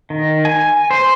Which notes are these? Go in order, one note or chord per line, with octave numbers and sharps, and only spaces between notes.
D#3
G#5
C5